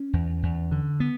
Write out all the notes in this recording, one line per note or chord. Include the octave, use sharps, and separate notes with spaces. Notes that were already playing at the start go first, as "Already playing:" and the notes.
Already playing: C#4
E2
E2
D3
B3